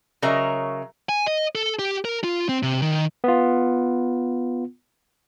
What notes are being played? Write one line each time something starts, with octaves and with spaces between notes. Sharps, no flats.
C#3 F#3 A#4 D#5 E5 A#5
G#5
D#5
A4
G4
A#4
F4
C4
C3
D#3
B3 F4